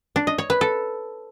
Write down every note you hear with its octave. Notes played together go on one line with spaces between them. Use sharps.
D4
D#5
C#5
B4
A4